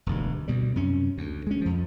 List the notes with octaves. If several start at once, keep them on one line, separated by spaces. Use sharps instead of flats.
E1 D2 G2
D2 B2 G3
F#2 C3 C#4
D2
G#3 C#4
F2 F3